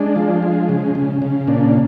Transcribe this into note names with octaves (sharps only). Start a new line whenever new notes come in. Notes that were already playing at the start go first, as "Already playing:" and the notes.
Already playing: G#3 D4
F3
G#3
C#3
C#3
C#3
A#2 D4